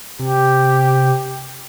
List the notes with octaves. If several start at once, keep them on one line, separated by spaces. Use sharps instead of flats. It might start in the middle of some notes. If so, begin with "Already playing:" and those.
C3 G4